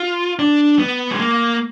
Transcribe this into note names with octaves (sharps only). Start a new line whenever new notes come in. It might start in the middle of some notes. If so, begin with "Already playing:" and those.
Already playing: F4
D4
B3
G#3
A#3